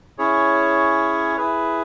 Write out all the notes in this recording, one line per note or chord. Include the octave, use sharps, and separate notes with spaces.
C#4 E4 G#4 C#5
E4 G#4 B4